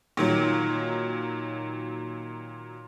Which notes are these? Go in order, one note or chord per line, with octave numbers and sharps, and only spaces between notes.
A#2 D#3 F#3